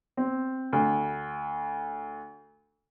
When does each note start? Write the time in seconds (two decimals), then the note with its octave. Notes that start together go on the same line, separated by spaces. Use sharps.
0.17 C4
0.73 D2